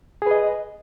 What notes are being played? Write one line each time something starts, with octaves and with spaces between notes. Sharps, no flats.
G#4 B4 D#5